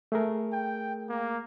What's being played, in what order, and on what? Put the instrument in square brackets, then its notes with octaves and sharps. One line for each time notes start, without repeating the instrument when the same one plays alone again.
[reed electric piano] A3 G#4 A#4
[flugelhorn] G5
A#3